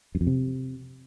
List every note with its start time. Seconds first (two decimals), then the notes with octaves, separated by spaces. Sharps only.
0.15 F#2
0.21 F2
0.27 C3